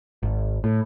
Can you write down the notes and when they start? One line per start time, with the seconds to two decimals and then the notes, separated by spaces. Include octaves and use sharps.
0.23 G#1
0.64 A2